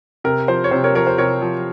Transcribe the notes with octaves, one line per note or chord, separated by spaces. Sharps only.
C3 A#4
F3 C5
C#5
C3 C5
A#4 C#5
F3 A#4 C#5
C5
C3 A#4 C#5
F3